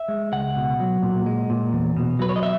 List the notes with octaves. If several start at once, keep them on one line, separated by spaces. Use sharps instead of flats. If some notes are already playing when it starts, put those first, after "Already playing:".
Already playing: E5
G#3
C#2 F#5
B2
F#3
A#2
G#3
A#2
E2
B2
F#3 B4
C#5
D#5
E5